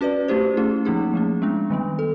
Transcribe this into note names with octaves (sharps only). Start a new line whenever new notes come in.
C#4 F#4 B4 D5
A3 C#4 E4 G4 C5
A3 C#4 E4 G#4
F3 A#3 D#4 G#4
F3 A3 C#4
G#3 B3 D4
D#3 G3 B3
A4